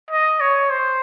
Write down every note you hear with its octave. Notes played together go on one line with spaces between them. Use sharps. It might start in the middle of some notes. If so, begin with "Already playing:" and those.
D#5
C#5
C5